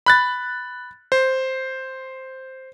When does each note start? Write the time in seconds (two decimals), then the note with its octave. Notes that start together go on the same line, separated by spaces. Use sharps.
0.06 B5 F#6 A6
1.12 C5